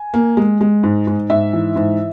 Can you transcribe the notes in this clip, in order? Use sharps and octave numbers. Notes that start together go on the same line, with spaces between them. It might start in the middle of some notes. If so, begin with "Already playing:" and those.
Already playing: G#5
A#3
G#3
G#3
G#2
G#2
G#2 E5
E3
G#2